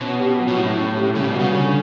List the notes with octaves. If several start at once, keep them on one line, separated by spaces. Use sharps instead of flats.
B2 C#4
G4
F#3
B2
A2 E4
C#4
G4
C#3 G3
B2
C#3 F#4
D3